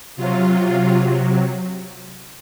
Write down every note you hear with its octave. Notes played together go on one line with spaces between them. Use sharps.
C3 F#3 F4